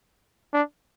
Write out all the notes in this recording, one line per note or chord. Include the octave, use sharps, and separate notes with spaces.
D4